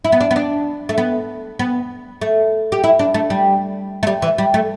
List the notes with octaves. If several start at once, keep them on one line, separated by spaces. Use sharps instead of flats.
E4
B3
D4
B3
D4
A3
B3
B3
A3
G4
E4
D4
A3
G3
A3
G3
E3
G3
A3